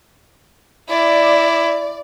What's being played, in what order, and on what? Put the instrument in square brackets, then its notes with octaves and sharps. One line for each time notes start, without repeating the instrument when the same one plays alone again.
[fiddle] E4 [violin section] D5